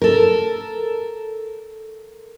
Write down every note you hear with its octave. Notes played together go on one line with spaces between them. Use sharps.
A4 A#4